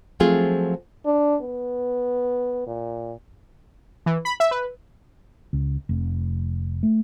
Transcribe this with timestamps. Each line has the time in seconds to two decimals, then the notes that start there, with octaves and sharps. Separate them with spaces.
0.20 F3 F#3 A3 C4 F4 G#4
1.06 D4
1.42 B3
2.67 A#2
4.06 E3
4.25 B5
4.40 E5
4.51 B4
5.53 C#2
5.89 F1
6.83 A3